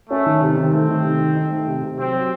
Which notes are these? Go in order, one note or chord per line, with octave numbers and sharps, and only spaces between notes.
A3 C#4
D#3
C3
D#3 C4
A3
D#3
C3
D#3
D#4
A3
C3
C3
F#3 C4
F#3